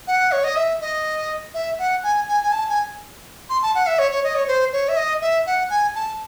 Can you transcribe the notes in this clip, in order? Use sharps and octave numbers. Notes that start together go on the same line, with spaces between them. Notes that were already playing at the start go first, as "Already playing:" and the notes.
F#5
C#5
D#5
E5
D#5
E5
F#5
G#5
G#5
G#5
A5
G#5
C6
A5
F#5
E5
C#5
C#5
D#5
C#5
C5
C#5
E5
D#5
E5
F#5
G#5
A5